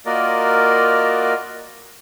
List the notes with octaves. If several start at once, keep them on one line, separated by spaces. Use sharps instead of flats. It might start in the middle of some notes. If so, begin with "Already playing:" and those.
A#3 F4 F#4 A#4 D5 D#5